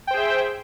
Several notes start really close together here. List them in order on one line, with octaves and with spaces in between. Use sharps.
G5 C5 G#4 E5